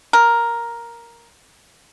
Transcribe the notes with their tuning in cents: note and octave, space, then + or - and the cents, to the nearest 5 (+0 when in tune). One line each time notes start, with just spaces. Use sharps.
A#4 +5